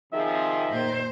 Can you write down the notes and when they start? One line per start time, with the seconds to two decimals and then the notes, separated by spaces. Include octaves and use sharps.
0.13 C3 D#3 F3 G#4 E5
0.71 A#2 C5